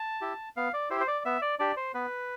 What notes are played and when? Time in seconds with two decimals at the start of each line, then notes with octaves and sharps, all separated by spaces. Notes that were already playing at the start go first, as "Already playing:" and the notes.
Already playing: A5
0.21 E4 G4
0.56 B3 F5
0.73 D5
0.90 E4 G4 C5
1.01 C5
1.08 D5
1.25 B3 E5
1.42 D5
1.59 D4 G4 D5
1.76 C5
1.94 B3 B4